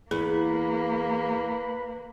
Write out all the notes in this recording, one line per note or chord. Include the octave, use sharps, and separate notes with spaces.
E2 A#3 G#4 B4